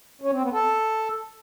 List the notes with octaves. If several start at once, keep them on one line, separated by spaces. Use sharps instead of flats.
C#4
C4
B3
A4